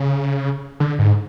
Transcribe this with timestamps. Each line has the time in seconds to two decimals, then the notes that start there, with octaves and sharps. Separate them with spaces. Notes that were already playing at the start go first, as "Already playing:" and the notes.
Already playing: C#3
0.80 D3
0.99 G#2